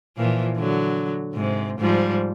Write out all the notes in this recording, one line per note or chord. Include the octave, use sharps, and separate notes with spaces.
A#2 E3 F3
D3 F#3
G#2 C3
G#2 F3 G3